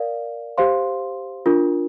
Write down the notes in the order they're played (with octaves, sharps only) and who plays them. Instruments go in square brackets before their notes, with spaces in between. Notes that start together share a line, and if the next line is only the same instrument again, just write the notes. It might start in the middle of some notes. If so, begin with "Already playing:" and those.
Already playing: [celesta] A#4 D5 F5
G4 C5 F5 C6
D4 F4 A#4